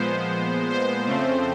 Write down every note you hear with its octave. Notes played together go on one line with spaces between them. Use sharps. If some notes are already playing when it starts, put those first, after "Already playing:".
Already playing: A#2 F3 G#3 B3 C5
C5
F2 C#3 F3 A3 C4